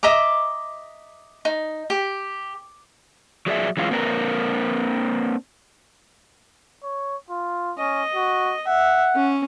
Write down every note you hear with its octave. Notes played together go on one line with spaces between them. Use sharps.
D#5 E5 A#5 D6
D#4
G4
F#3 G#4 D5 E5
E3 G#3 C#4 F4
A#3 C4 D4 A#4 B4
C#5
F4
C#4 D#5
F#4
E5 F#5
C#4